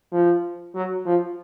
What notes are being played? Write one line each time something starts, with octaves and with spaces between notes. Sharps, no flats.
F3
F#3
F3